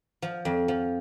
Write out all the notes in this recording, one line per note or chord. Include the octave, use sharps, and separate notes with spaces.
F3
F2
F3